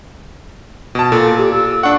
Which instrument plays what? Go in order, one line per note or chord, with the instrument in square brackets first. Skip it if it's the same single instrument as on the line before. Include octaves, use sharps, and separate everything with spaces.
[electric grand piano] B2 A5
[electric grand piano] A#2 [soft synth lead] A4
[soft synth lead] G4
E6
[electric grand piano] D4 F#5 [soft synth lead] C#6